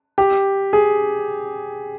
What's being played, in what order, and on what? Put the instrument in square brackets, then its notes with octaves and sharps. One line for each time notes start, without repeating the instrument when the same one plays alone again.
[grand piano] G4
G#4